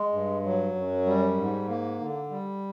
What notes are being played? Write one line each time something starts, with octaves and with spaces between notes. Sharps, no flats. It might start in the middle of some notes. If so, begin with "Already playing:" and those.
Already playing: G#3
G2
F#3
F#2
G3
G#2
A#3
D3
G3